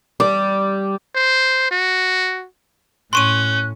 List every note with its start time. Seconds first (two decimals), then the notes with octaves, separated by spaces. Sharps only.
0.20 G3 D5
1.15 C5
1.71 F#4
3.13 A2 C#4 C6 C#6 F#6 D#7